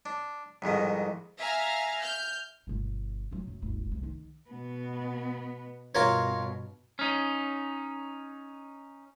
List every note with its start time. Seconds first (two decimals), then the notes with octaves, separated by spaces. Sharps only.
0.06 D4
0.62 C2 F2 G#2 D#3
1.38 E5 F5 G#5 A#5 F6
2.01 F6 G6
2.67 G1 B2
3.31 A#2 F#3
3.48 F#2
3.62 D#1 G#1
3.92 C2 F2
4.03 D#3
4.50 B2 B3
5.95 G2 B2 F4 A#4 C#5
6.99 C#4 D#4